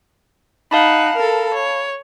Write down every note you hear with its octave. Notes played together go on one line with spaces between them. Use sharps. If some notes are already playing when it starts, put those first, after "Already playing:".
D#4 F5 F#5 A5 B5
A4 A#4
C#5